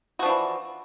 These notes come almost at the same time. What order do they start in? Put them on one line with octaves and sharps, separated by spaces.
F#4 F3 D4 E3